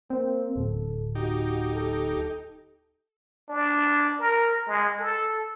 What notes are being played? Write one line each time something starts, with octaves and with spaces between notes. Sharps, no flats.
A#3 C4
D1 A4
D#4 F#4 G4
A4
D4
A#4
G#3
A4